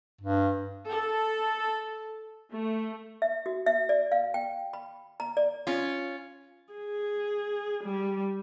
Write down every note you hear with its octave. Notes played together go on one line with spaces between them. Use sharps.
G2
A4
A3
E5
F#4
E5
D5
F5
G5
B5
A#5
D5
C#4 F4
G#4
G3